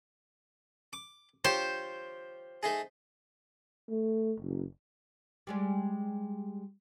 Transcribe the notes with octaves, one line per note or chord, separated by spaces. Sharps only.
D6
F4 G4 C5 C#5
A3 D#4 G#4
A3
F#1
G3 G#3 D5